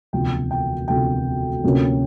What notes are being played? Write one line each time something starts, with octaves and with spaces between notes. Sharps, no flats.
E1 D2 C3 F3 G5
G5
E1 D2 C3 F3 G5
D2 C3 F3 A#3 C#4